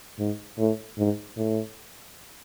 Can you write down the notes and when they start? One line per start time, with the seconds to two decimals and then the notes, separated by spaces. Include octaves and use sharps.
0.18 G#2
0.58 A2
0.98 G#2
1.37 A2